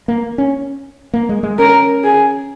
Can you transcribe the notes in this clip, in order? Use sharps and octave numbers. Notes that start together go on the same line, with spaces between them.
A#3
C#4
A#3
G#3
G#3
C#4 A#4
G#4